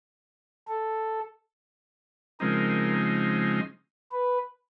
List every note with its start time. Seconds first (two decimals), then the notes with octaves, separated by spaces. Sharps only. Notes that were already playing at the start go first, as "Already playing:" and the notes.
0.68 A4
2.40 C#3 F3 G#3 C4 D#4 A#4
4.12 B4